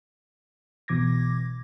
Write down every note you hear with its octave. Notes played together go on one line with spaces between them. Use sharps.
B1 B2 E3 D6 G#6 A#6